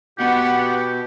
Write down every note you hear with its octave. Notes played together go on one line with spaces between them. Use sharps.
B2 B3 G4 F#5